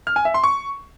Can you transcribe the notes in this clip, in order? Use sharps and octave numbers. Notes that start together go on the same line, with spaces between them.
F6
G#5
E5
C6
C#6